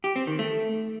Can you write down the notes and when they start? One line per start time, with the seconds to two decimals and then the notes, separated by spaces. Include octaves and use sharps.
0.04 G4
0.16 C4
0.27 D#3
0.39 A3